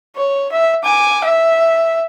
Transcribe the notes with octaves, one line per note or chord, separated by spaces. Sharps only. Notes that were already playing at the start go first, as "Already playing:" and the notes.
C#5
E5
G#5 D6
E5